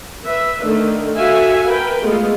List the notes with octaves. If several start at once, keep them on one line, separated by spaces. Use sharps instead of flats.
B4 E5
D3 D#3 A3
F#4 A4 E5 F5 G#5
A#4 B4 G5
G#3 A3 B3 F4